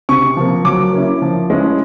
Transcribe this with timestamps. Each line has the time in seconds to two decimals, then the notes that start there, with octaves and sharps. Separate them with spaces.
0.09 C3 C#6
0.37 F3 A#3
0.65 F#3 D6
0.93 A#3 C#4 E4
1.22 F3
1.50 G#3 C#4 E4